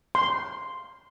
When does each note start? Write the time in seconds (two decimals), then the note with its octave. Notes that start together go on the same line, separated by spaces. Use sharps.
0.15 C6